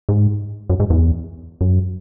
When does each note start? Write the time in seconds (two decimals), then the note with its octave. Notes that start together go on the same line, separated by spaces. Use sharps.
0.09 G#2
0.70 F#2
0.80 G#2
0.90 E2
1.61 F#2